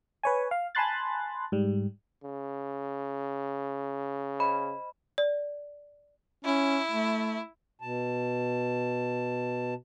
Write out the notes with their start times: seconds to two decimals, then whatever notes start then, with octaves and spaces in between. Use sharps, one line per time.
0.23 B4 C#5 G#5
0.51 F5
0.75 G#5 A5 B5 C6 F#6 A6
1.52 G#2 G3
2.24 C#3
4.40 C5 D#5 B5
5.18 D5
6.45 C#4 E4
6.91 A3
7.82 B2 A5